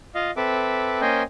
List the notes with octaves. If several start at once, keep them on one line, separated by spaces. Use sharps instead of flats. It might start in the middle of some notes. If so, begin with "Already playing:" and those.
F4 D#5 F5
C4 A4 B4 E5 D6
A#3 C#4 C5 D#5 G5 G#5